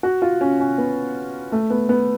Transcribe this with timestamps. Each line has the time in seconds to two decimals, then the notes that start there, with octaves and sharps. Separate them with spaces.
0.03 F#4
0.22 F4
0.41 C#4
0.60 C#4
0.78 B3
1.52 A3
1.70 B3
1.89 B3